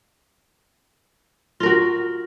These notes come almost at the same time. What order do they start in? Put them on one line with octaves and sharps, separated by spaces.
F4 A#4 F#4